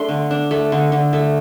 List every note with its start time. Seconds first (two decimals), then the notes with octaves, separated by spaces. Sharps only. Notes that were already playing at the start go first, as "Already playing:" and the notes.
Already playing: A3 D4 C6
0.09 D3
0.31 D4
0.51 A3
0.72 D3
0.92 D3
1.13 A3